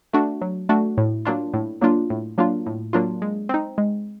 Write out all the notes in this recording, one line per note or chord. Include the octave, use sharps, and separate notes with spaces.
A3 D4 F#4
F#3
A3 D4 F#4
A2
F#3 A#3 D4 F4
A2
F#3 A#3 D4 F4
A2
F#3 A#3 D4 F4
A2
F#3 A#3 D4 F4
G#3
C4 D#4
G#3